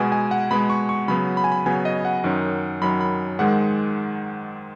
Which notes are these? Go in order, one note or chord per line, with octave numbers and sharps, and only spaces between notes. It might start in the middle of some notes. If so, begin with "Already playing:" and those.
Already playing: B2 G#3 B3 G#5
G#5
F#5
B2 G#3 B3 B5
C#6
C#6
C#3 F#3 B3 B5
B5
G#5
B5
C#3 F#3 B3 G#5
D#5
F#5
F#2 D#3 F#3 C#4
F#2 D#3 F#3 C#4 B5
B5
G#2 D#3 G#3 F#5